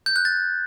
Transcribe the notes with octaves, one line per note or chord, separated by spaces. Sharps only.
G6
F#6
A6